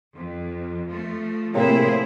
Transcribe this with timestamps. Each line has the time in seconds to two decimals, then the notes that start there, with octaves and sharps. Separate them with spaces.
0.15 F2
0.89 F3 A3
1.54 A2 C3 A#3 E4 G#4 C5